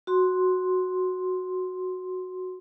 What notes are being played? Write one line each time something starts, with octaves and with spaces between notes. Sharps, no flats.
F#4 C6